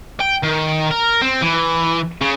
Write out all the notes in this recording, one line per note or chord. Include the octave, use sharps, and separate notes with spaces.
G5
D#3
A#4
C4
E3
C#3